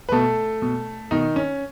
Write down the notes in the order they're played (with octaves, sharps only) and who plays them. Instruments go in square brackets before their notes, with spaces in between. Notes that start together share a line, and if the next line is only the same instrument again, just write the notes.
[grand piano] B4
B2 A3 A4
B2
B2 D#3 D#4
C#4